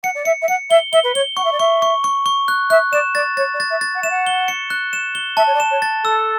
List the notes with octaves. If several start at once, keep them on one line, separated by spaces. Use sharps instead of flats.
F#5 C#7
D5
E5 C#7
E5
F#5 C#7
E5 G7
E5 G7
B4
C#5 G7
F#5 C#6
E5
D5
E5 C#6
C#6
C#6
C#6
F#6
E5 F#6
D5 E7
D5 A6
C#5 A6
D5
A6
E5
A6
F#5
E5 E7
F#5
G7
C#7
F#6
E7
G7
E5 A5
C#5
D5
E7
C#5
A6
A4 E6